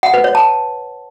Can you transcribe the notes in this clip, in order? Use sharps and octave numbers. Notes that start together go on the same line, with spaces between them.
F#5
B4
C#5
A5